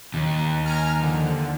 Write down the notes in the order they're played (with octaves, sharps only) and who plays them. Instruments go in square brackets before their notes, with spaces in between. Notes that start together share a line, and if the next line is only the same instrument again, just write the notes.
[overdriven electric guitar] D#2
[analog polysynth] G#5 A#5 F6
D3 F3